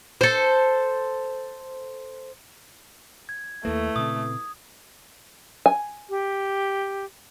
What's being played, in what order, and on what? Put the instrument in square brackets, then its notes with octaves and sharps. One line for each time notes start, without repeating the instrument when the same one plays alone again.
[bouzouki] A4 C5
[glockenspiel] G#6
[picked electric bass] D#2 A#3 [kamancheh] A3 [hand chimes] E4 A4 B4
[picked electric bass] A#2 C#3 C4 [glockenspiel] D#6
[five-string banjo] G#5
[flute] G4